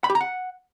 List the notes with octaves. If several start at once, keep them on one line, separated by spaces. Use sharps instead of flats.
B5
G4
A#5
F#5